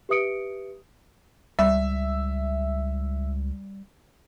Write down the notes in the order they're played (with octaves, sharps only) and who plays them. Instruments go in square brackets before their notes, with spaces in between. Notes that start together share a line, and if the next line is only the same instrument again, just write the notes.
[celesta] G4 B4 E5 D#6 C#7 D7
[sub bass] C#2 [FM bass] G3 [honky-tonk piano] E5